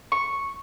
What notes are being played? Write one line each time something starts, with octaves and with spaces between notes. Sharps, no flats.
C#6